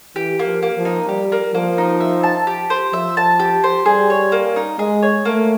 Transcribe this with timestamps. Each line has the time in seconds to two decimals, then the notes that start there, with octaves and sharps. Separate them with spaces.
0.16 E3 G4
0.39 A#3
0.46 F3
0.63 A#3
0.78 F3
0.85 D#4
1.08 G3 G4
1.32 A#3
1.54 F3 A#3
1.78 D#4
2.00 E5
2.23 A5
2.47 G4
2.70 C5
2.93 F3 E5
3.17 A5
3.39 G4
3.64 C5
3.86 G3 G#4
4.10 C#5
4.32 A#3
4.56 D#4
4.78 G#3 G#4
5.03 C#5
5.25 A3 A#3